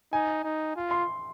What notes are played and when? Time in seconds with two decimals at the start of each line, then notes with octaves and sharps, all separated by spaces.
0.12 D#4 G#5
0.44 D#4
0.76 F4
0.91 C6